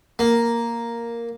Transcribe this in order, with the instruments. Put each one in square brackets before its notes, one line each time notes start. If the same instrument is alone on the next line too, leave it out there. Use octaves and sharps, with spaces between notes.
[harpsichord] A#3